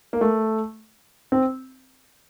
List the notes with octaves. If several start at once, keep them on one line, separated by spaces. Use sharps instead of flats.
A#3
A3
C4